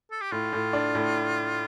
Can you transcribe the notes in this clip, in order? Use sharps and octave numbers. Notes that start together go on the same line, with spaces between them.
A4
G4
A2 F4
A2
D4
A2